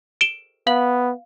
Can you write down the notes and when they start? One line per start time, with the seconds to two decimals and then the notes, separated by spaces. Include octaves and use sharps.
0.21 D7 E7 G7
0.67 B3 F5 F#7